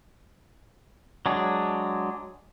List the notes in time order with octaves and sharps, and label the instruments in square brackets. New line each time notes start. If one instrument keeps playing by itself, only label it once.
[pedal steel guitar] F#3 G#3 D4 G#4